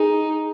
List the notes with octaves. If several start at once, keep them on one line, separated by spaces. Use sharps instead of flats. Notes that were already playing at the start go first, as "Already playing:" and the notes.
Already playing: D#4 G#4